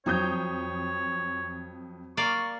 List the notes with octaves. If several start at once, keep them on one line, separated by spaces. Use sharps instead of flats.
F2 F#3 C5 C#5 D#6 G6
A#3 D5 F5 C#6